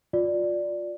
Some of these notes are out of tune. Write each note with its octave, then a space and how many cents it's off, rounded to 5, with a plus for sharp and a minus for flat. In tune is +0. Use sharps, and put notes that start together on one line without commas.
F4 +30 D5 +0